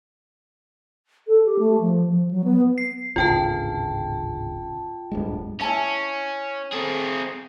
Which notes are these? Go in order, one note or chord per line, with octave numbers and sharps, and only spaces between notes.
A4
G4
A3
F3
F3
F#3
B3
C7
D1 G#1 C#3 F4 G5 A5
D1 G2 G#3
C#4 E4 G#5 A5
C4 G#4 A4